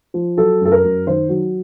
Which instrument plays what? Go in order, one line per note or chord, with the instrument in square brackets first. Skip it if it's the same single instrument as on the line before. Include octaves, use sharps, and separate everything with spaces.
[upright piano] F3
F#3 A4
F#2 A4
A#4
F#2
D#3 C5
F#3